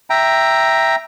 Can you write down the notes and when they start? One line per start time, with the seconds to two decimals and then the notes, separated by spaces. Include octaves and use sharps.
0.10 E5 G5 A#5